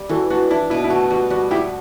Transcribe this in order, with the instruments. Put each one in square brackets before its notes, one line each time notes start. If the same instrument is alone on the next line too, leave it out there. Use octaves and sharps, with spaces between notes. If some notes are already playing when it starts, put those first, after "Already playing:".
Already playing: [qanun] G3
[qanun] E3 [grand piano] F#4 A4
[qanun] D4 [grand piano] F#4
[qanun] D4 [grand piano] E4
[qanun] B2 [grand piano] E4
[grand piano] E4
[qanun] A3 [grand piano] F#4
[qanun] G3 [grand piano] F#4
[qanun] G3 [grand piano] F#4
[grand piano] E4 G4 [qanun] F#4